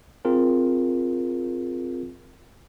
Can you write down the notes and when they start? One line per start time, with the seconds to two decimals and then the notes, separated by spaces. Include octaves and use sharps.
0.25 C4 F4 G#4 A#4